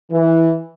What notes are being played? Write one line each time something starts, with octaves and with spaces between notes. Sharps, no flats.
E3